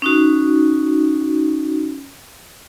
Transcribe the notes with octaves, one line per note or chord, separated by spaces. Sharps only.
C#4 D#4 F#4